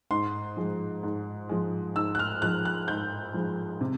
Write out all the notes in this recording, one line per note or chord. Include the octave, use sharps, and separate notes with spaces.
G#2 C6
F3 G#3
G#2
F3 G#3
G#2 E6
F#6
F6
F3 G#3 F#6
F#6
G#2 G6
F3 G#3
C3